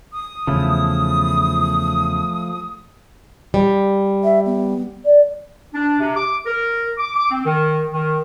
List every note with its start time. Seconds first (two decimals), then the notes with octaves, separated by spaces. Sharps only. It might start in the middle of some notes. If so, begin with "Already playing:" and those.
0.13 D#6
0.47 E2 C#3 F3 A3 E4
3.54 G3
4.23 E5
4.45 B3
5.05 D5
5.74 D4
6.00 C3
6.16 D6
6.46 A#4
6.97 D6
7.14 D6
7.30 C4
7.45 D#3
7.93 D#3